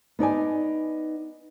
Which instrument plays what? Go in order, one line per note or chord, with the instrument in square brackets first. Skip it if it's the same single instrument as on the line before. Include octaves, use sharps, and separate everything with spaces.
[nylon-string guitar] B3 D#4 D5 G#5